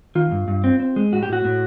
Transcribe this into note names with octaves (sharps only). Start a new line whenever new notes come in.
D#3 F4
G2
G2
C4
C4
G#3
A2 F#4
G4
A2 F#4
A2